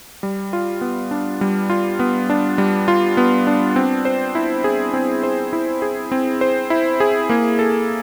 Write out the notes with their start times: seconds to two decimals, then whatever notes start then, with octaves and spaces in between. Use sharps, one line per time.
0.23 G3
0.53 F4
0.81 B3
1.11 D4
1.41 G3
1.70 F4
1.99 B3
2.30 D4
2.58 G3
2.88 F4
3.17 B3
3.47 D4
3.76 C4
4.05 C5
4.35 E4
4.64 G#4
4.94 C4
5.23 C5
5.53 E4
5.82 G#4
6.12 C4
6.41 C5
6.70 E4
7.00 G#4
7.29 A#3
7.59 A4